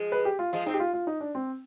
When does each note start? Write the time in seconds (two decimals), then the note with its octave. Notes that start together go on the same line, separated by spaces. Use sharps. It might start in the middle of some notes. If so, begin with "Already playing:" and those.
Already playing: F3 G#3
0.12 B4
0.25 G4
0.39 F4
0.53 F3 G#3 F4
0.66 G#3 C4 D#4
0.74 G4
0.80 F4
0.94 F4
1.07 D#4
1.21 D4
1.35 C4